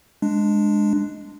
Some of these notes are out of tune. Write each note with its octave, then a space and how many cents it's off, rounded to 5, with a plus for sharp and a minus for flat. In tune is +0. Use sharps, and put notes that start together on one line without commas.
G#3 +0 D4 +10